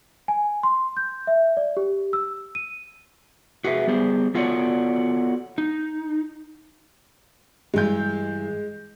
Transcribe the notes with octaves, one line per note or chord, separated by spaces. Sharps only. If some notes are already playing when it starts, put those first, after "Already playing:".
G#5
C6
G6
E5
D5
G4
E6
D#7
F#4 G#4 B4 E5
G3 B3 G#4 C5
B3 F4 F#4 A4 C#5 D5
D#4
G2 E3 G#3 G6